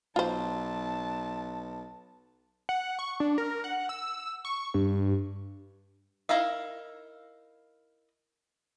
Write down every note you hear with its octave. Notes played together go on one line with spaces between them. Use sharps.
B1 F4 C5 A5
F#5
C#6
D4
A#4
F#5
E6
C#6
G2
D#4 E4 A#4 E5 F5